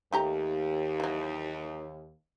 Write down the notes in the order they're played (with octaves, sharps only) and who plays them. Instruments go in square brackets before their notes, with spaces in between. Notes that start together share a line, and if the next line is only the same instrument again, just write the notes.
[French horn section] D#2 [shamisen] A3 G4 A#5
[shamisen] E3 F#3